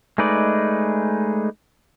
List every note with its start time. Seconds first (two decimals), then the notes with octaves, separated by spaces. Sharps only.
0.18 G#3 A3 D#4 B4 D5